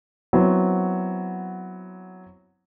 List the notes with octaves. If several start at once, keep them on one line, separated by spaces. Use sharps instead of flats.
F#3 B3 C4 E4 F#4 C#5